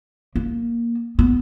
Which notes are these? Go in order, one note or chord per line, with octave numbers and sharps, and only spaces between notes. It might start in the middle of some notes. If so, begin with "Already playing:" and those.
A#3
B3